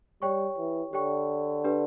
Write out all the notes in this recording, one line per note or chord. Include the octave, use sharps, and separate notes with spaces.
G3 G4 C#5 G5 C#6
E3
D3 G4 C#5 G5 C#6
D4 G4 B4